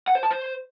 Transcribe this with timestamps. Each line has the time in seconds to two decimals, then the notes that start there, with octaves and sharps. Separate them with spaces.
0.08 F#5
0.15 C5
0.23 A5
0.31 C5